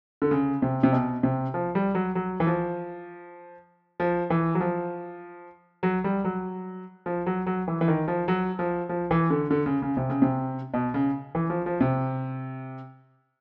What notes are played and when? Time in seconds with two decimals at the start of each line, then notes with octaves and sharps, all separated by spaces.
0.22 D3
0.31 C#3
0.62 C3
0.83 C3
0.92 B2
1.23 C3
1.54 F3
1.75 G3
1.95 F#3
2.15 F#3
2.40 E3
2.47 F3
4.00 F3
4.30 E3
4.55 F#3
4.60 F3
5.83 F#3
6.04 G3
6.25 F#3
7.06 F3
7.26 F#3
7.46 F#3
7.68 E3
7.81 E3
7.88 D#3
8.08 F3
8.28 F#3
8.59 F3
8.89 F3
9.11 E3
9.30 D3
9.51 D3
9.66 C#3
9.82 C#3
9.97 C3
10.10 C#3
10.22 C3
10.74 B2
10.94 C#3
11.35 E3
11.50 F3
11.66 F3
11.81 C3